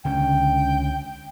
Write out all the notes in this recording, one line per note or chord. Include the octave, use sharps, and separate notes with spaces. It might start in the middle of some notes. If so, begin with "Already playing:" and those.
C#2 D3 C#4 G5